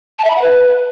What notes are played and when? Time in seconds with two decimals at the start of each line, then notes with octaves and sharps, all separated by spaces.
0.19 A5
0.24 E5
0.30 B5
0.36 F#5
0.41 B4